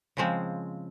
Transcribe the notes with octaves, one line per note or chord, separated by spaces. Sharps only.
C#3 F3 G#3 C4